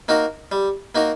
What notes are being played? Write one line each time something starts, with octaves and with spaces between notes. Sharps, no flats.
A#3 D#4 F#4 A#4
G3
A#3 D#4 F#4 A#4